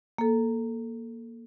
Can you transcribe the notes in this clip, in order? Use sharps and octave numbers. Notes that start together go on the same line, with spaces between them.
A#3 A4